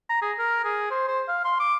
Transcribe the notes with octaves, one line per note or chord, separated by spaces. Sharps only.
A#5
G#4
A#4
G#4
C5
C5
F5
C6
D6